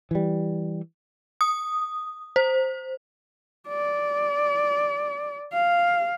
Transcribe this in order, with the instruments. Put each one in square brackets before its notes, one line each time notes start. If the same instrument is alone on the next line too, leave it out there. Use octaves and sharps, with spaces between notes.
[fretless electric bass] E3 G3
[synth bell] D#6
C5
[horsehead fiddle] D5
F5